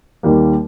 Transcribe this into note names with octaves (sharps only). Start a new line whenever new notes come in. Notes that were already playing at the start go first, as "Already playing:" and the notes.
D#2 D#3 G3 A#3